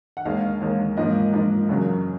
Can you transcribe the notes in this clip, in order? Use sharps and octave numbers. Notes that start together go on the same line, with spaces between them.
F#5
D#2 D#3 G#3 F5
D#2 D#3 G#3
G#2 F3 A#3 D#5
G#2 F3 A#3
F#2 C#3 F#3